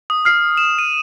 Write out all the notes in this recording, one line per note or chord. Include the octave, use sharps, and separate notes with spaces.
D#6
F6 C7
E7
D#7